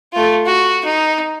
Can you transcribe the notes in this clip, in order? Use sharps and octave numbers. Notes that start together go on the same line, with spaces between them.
A3 F4
F#4
D#4